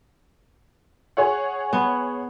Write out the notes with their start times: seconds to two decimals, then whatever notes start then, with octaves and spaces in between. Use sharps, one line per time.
1.17 G#4 C#5 F#5
1.73 B3